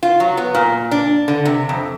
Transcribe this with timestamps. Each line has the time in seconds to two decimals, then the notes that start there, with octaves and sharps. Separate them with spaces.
0.03 F4
0.20 F#3
0.37 B3
0.55 A#2
0.91 D4
1.28 D3
1.45 C3
1.69 F2